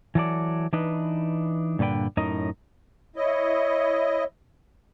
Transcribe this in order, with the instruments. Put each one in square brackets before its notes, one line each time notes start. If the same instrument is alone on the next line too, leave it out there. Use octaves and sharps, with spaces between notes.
[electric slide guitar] E3 F#3 A4 D5
E3 D4 D#4 B4
G2 A#2 D3 B4 G5
F#2 A2 D#4 A#4 D#5
[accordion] E4 D#5 [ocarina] C#5